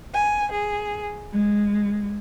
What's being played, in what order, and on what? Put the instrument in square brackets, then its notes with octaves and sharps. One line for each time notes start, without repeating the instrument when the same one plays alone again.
[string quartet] G#5
G#4
G#3